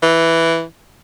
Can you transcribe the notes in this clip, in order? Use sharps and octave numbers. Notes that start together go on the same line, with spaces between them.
E3